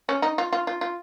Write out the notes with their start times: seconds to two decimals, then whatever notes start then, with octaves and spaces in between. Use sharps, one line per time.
0.09 C#4
0.22 D#4
0.38 F4
0.52 F4
0.67 F4
0.81 F4